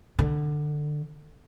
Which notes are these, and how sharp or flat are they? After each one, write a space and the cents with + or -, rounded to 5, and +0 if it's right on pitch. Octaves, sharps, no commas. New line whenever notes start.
D3 +20